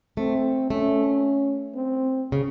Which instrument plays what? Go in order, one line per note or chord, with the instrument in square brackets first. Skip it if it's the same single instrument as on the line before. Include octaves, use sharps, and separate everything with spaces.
[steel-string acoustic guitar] A3 [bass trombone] C4
[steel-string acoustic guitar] A3 [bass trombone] C#4
[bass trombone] C4
[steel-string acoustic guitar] C#3